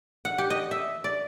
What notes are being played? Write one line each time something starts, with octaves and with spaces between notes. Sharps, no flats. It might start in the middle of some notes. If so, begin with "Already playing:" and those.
F#5
G4
D#5
E5
D5